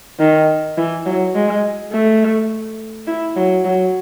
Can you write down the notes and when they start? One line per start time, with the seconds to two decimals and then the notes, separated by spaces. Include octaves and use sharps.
0.20 D#3
0.78 E3
1.06 F#3
1.35 G#3
1.92 A3
3.08 E4
3.36 F#3
3.65 F#3